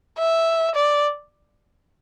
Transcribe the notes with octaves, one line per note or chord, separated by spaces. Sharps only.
E5
D5